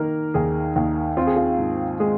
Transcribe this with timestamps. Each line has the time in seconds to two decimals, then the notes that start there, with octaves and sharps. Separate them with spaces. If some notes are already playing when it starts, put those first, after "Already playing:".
Already playing: D#3 A#3 A#4
0.34 D#2 G#4
0.76 D#2
1.17 C4 F4
1.27 G#4
1.36 F4
1.59 G#2
2.00 G#3 G#4